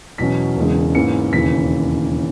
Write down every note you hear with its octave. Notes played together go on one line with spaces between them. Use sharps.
E2 B2 F#3 C#4 B6
E1 E2 C#3 G#3
G#2 E3 A#3 C#4 C#7
E1 D#2 C#3 E3 B6